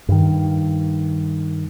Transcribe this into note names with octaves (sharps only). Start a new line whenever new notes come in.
G2 D#3